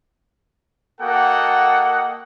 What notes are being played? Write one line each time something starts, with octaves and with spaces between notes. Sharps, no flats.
A#3 F#4 A4 D#5 F#5 G5